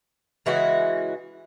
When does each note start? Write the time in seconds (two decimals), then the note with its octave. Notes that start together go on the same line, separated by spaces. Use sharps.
0.46 C#3 E3 G#3 F#4